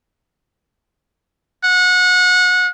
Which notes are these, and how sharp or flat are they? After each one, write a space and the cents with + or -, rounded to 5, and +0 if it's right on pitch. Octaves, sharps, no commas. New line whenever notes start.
F#5 -25